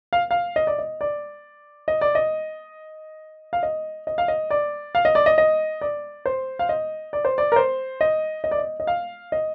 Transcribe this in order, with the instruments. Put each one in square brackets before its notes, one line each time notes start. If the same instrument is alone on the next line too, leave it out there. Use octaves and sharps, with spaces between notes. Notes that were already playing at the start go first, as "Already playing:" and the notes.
[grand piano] F5
F5
D#5
D5
D#5
D5
D#5
D5
D#5
F5
D#5
D#5
F5
D#5
D5
F5
D#5
D5
D#5
D#5
D5
C5
F5
D#5
D5
C5
D5
A#4
C5
D#5
D#5
D5
D#5
D#5
F5
D#5